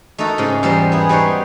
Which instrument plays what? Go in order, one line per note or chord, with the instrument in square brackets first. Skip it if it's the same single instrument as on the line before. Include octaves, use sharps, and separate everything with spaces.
[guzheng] A3 D#4 F#4 A4 A#4
G#2 C#3 F4
E2 G#2 G3 F4 A#4 C5
B3 E4 G#4
G3 B3 D#4 F#4 C5 C#5